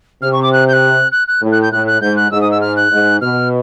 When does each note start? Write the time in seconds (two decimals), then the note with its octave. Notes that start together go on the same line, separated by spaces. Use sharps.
0.22 C3 F6
0.33 C#6
0.43 D6
0.53 F#6
0.68 G6
0.73 F#6
1.12 F#6
1.28 F#6
1.42 A2
1.52 F#6
1.62 G6
1.72 A2 F#6
1.87 F#6
2.01 G#2 G6
2.16 F#6
2.32 G#2 E6
2.41 D#6
2.51 E6
2.61 F6
2.76 F#6
2.91 G#2
3.21 B2 F6